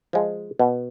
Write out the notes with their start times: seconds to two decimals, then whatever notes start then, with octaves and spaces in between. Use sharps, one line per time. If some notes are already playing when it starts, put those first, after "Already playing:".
0.13 F3 G#3
0.59 B2